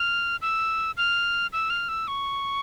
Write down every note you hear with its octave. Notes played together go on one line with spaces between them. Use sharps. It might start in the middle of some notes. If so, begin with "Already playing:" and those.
Already playing: F6
E6
F6
E6
F6
E6
C#6